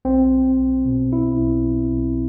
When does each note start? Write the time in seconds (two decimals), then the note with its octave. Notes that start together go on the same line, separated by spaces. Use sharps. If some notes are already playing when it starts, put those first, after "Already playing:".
0.05 B1 C4
0.32 B1
0.59 B1
0.85 B2
1.12 B1 E4
1.39 B1
1.66 B1
1.93 B1